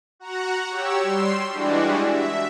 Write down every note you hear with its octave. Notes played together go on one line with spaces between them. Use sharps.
F#4 F#5 A#5
G4 C#5 E6
G3 C6 E6
E3 G3 G#3 D4 F#4
E5